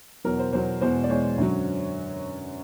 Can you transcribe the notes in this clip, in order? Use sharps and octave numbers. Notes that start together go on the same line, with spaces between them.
E2 B2 F#3 A#4
C5
E2 B2 F#3 C5
E2 B2 G#3 C5
D5
E2 B2 G#3 C#5
F#2 D3 F#3